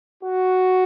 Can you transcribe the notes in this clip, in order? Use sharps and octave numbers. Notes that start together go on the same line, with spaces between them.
F#4